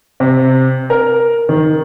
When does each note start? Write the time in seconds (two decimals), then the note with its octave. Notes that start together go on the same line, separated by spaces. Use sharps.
0.20 C3
0.90 A#4
1.49 D#3